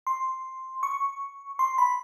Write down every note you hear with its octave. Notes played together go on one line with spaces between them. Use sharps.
C6
C#6
C6
B5